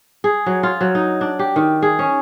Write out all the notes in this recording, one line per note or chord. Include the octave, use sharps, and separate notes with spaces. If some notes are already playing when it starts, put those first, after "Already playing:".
G#4
F#3
F4
F#3
D#4
D4
G4
D#3
G#4
C#4